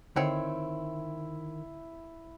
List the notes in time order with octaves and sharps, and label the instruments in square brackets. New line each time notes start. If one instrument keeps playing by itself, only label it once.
[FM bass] D3 [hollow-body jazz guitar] D#3 [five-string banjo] C4 C#5 [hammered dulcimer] E4